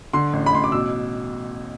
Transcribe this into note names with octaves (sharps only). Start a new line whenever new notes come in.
D3 C6
A1
B5
A1 C6
D6
B2 E6